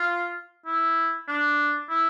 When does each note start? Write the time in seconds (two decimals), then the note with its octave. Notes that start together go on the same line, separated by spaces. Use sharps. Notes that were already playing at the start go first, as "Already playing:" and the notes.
Already playing: F4
0.66 E4
1.28 D4
1.90 E4